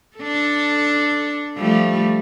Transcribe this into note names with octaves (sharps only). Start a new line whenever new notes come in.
D4 A4
F3 G3 A3